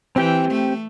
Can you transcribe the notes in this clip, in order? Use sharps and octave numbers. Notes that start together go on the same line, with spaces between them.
E3 C4 G4 G5
A3